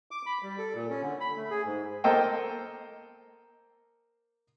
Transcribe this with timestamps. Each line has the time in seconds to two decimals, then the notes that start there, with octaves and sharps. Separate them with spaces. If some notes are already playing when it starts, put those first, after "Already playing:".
0.11 D6
0.26 B5
0.43 G3
0.58 A4
0.75 A#2
0.90 C#4
1.02 D3
1.20 B5
1.36 A3
1.50 G#4
1.65 G#2
2.04 A#3 A4 C5 D#5 G5